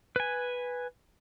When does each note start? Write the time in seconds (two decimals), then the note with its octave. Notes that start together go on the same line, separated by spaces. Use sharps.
0.16 B4 G#5